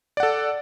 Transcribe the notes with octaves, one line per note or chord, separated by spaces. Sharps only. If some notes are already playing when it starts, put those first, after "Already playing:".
A4 D5 F#5